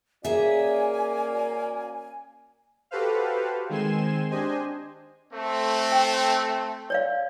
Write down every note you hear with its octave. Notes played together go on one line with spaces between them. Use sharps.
A#3 C#4 F#4 G#4 D5 E5 G#5
F#4 G4 A4 B4 C5 F5
D#3 G#3 C4 G#5 C6 E7
D4 G4 C5 D#5 G#5
A3 C4
G5
C#5 D5 F5